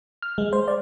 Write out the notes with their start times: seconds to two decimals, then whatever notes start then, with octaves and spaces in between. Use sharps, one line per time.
0.22 F6
0.38 G#3
0.53 C5
0.68 D5